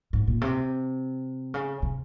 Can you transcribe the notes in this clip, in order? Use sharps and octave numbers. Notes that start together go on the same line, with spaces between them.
G#2
A#2
C3
C#3
C3